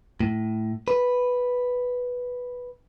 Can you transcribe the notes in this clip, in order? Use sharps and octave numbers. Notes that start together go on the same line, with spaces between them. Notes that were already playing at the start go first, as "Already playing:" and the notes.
A2
B4